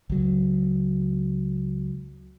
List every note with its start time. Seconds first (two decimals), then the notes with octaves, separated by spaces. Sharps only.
0.10 C#2 F#3